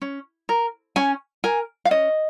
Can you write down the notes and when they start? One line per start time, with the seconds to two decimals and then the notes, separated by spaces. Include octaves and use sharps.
0.01 C#4
0.49 A#4
0.96 C#4 G#5
1.44 A#4 G#5
1.85 F5
1.91 C#4 D#5